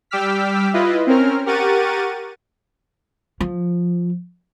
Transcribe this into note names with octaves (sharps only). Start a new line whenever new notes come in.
G3 G5 D6 E6 F6 B6
E4 F4 B4 D#5
C4 C#4 A#4 F6
G4 A#4 F#5 C#6 A6 D#7
F3